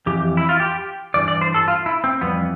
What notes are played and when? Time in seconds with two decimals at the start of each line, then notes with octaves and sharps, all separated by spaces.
0.06 F2 E3 G4
0.37 E4
0.49 F4
0.60 G4
1.14 G2 E3 D5
1.28 D5
1.41 C5
1.54 A4
1.68 F4
1.86 E4
2.04 C4
2.21 F2 E3 G3 B3